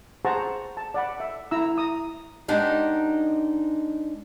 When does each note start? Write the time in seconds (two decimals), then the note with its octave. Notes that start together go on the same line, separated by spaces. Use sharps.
0.25 G#4 C5 F#5 A5 A#5 C#6
0.77 A5
0.94 D5 F#5 B5
1.20 E5
1.51 E4 A#5 E6
1.78 A#5 D#6
2.48 G#3 B3 D4 D#4 G4